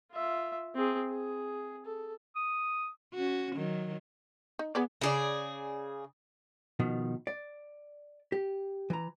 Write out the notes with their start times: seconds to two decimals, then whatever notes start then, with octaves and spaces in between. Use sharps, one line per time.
0.12 F4 E5
0.75 C4 G#4
1.10 G#4
1.85 A4
2.36 D#6
3.14 C#4 F#4
3.55 D#3 F#3
4.59 D#4
4.75 B3 G#4 B4 D5
5.01 C#3 G#4 D5
6.79 B2 D#3 F3
7.27 D5
8.32 G4
8.90 E3 A#5